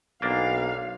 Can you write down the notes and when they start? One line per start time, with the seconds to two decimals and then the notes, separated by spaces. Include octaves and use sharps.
0.22 B1 A#3 D4 F5